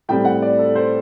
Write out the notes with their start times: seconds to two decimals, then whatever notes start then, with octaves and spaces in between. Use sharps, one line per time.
0.09 A2 G3 C4 G5
0.25 F#5
0.42 D5
0.59 A4
0.75 C5